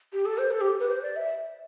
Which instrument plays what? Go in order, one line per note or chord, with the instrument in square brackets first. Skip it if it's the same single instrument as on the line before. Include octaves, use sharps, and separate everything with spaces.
[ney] G4
A4
C5
A4
G4
B4
C5
D5
E5